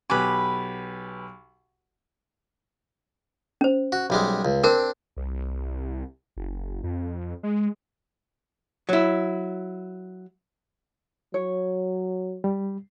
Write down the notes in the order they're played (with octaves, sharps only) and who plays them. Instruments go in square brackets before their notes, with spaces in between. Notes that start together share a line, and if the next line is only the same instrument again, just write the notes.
[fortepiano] B1 G4 G#5 [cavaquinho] B4 D6
[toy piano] C#4 C5
[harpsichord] F#4
B1 G3 G#3
C#2
[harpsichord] C4 D4 [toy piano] A#4
[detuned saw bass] C2
F#1
F2
G#3
[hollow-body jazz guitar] F#3 E4
[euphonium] F#3 [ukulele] C#5
[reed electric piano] G3